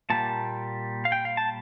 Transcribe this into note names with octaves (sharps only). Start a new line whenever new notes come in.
A#2 G3 A#3 A5
F5
G5
F5
A5